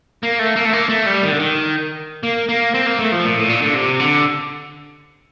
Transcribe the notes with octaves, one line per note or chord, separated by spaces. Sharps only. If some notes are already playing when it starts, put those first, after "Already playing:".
A#3
A3
A#3
A3
A#3
A3
G3
D#3
D3
D#3
A#3
A#3
C4
A#3
A3
F3
A#2
A2
A#2
D3
C3
D3